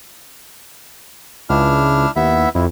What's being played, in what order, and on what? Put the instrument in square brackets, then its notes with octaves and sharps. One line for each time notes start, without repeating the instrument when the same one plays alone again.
[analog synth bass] C#2 [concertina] D4 E4 F6
[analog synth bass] D#2 [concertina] B3 E4 E5
[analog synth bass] F2 [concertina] E4